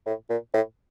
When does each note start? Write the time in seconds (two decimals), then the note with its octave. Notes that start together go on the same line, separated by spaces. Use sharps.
0.06 A2
0.30 A#2
0.54 A2